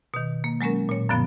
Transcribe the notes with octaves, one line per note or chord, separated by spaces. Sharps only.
B2 D#3
A#3
F#3 G#3 A#3 C#4 A#4
A#2 C#5
F#2 A#2 D3 F3 B3